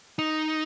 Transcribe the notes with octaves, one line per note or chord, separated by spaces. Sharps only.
D#4